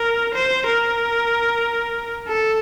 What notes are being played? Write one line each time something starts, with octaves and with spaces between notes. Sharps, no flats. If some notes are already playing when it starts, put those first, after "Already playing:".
Already playing: A#4
C5
A#4
A4